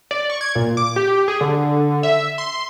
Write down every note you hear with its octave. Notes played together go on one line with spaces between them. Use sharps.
D5
C#6
G#6
A#2
D6
G4
G#4
D3
E5
C6